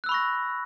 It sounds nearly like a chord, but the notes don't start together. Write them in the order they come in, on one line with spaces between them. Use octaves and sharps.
F#6 E6 B5 C#6 A#6